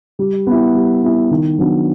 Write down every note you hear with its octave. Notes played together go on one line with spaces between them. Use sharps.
G3
B3 E4
G3
B3 E4
D#3
F#3 B3 D4